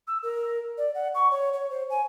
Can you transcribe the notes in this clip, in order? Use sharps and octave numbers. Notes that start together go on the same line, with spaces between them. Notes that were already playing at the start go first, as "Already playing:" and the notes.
E6
A#4
D5
F#5
C#6
C#5
C#5
C5
G#5